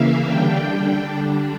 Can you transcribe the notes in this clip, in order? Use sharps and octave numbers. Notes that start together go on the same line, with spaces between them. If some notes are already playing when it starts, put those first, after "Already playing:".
Already playing: C#3 E3 A#3 E5 F5
D3 G3 D4 G5
D3 G3 D4